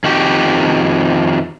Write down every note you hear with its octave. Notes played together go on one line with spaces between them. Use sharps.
F2 D#3 F#4 G4